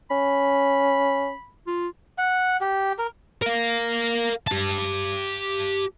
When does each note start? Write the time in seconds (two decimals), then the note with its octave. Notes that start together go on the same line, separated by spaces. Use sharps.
0.11 C#4 B5
1.67 F4
2.18 F#5
2.61 G4
2.99 A#4
3.42 A#4 F5
4.48 G4 A5